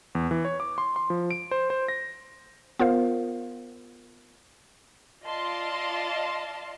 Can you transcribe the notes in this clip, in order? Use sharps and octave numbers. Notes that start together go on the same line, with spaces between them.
E2
E3
C#5
D6
C6
C6
F3
D7
C5
C5
A#6
B3 F4 A#4 C5 F5
F4 D5 D#5 F5 A5 C6